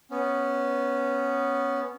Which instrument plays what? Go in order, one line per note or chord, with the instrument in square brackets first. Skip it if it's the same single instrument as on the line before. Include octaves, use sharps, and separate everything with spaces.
[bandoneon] B3 C#4